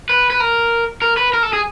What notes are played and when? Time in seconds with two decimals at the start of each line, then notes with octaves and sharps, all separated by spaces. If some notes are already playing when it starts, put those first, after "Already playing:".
0.09 B4
0.30 B4
0.40 A#4
1.02 A#4
1.17 B4
1.34 A#4
1.43 A4
1.53 G#4